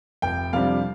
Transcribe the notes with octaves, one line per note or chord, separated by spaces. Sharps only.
F1 G5
F2 C3 G3 D4 F5